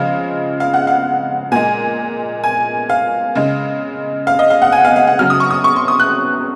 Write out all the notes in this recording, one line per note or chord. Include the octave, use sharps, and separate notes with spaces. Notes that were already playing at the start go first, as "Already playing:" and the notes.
Already playing: C#3 F3 G#3 F5
F5
F#5
F5
A#2 G#3 G#5
G#5
F5
C#3 G#3
F5
D#5
F5
F#5
G#5
F5
F5
F#5
C#3 F#3 F6
D#6
C#6
D#6
C#6
C6
D#6
F#6